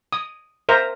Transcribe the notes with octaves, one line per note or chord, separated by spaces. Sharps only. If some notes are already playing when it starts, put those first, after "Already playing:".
D#6
A#4 C5 E5 A#5